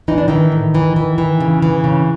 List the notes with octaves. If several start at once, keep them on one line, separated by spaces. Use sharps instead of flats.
E3 D#4
D4
D#3 E3 D#4
A2
E3
E3
E3
C#3
E3
C#3